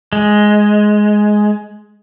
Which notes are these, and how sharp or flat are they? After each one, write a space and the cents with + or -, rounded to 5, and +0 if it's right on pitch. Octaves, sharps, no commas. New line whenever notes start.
G#3 +10